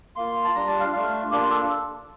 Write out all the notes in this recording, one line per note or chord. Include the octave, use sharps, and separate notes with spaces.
A#3 F4 C6
A5
G3 D4 F4 A#5
A5
F5
A3 D4 F4 F5
A#3 D4 F4 G4
A4